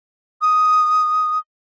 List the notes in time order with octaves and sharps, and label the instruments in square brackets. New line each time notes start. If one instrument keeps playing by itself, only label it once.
[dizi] D#6